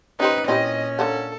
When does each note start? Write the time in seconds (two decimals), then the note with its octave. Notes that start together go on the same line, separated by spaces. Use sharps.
0.20 C#4 D#4 G4 B4 C5
0.48 A#2 C4 C#4 E4 G4 D#5
0.99 D3 A#3 A4 F#5